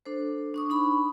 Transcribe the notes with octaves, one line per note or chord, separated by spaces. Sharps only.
D4 A4 C5
D4 C#6 D#6
D4 D#4 B5 C#6